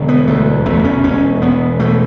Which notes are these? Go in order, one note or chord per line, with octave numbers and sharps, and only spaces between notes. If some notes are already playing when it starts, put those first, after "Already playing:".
Already playing: E1 D3
B3
D2 A3
E1 A3
C#4
E1 C#4
E1 B3
B2 A3